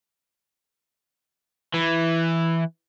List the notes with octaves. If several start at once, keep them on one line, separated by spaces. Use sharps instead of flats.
E3